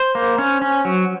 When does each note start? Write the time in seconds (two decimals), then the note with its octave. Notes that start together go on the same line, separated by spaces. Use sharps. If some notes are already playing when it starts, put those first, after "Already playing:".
Already playing: C5
0.15 A#3
0.38 C#4
0.62 C#4
0.85 F#3